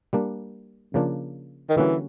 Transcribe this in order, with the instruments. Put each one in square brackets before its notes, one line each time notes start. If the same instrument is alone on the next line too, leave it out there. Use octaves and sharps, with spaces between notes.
[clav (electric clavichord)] G3 A#3 D4
C#3 F3 A#3 D4
[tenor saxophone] D#3
[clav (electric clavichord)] D3 G3 A#3 C#4 F#4 [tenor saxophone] E3